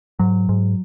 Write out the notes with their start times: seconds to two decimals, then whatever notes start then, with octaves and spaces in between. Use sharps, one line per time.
0.19 G#2 F#3
0.49 G#2